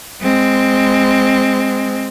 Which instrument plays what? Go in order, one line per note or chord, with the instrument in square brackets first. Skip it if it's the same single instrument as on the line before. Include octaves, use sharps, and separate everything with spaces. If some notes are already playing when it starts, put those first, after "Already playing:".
[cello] G#3 C4